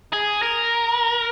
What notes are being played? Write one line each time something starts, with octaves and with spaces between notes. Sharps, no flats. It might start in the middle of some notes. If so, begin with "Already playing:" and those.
G#4
A#4